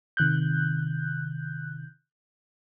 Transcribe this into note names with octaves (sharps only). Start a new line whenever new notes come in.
C3 D#3 F#6 G6